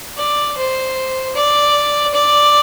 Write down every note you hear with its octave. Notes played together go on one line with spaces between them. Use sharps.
D5
C5
D5
D5